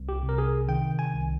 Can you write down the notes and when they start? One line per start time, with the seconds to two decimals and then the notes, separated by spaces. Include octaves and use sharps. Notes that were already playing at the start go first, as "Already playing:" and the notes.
Already playing: C2
0.09 G4
0.23 C3
0.29 A#4
0.38 G#4
0.69 D#3 G5
0.99 G#5
1.14 C2